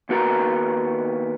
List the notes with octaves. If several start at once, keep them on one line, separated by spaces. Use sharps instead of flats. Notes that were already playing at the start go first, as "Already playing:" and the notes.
D#2 B3 F#4 A#4 A#5